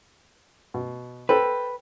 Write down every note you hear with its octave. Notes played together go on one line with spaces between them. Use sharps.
B2
A4 B4 C5 G5